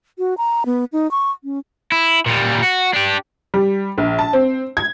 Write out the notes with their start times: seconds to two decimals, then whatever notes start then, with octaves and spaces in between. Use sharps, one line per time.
0.19 F#4
0.38 A#5
0.66 B3
0.93 D#4
1.11 C#6
1.44 C#4
1.92 E4
2.26 A#2 G3
2.63 F#4
2.94 D4 G4
3.54 G3
3.98 A#1
4.19 A5
4.33 C4
4.77 G#6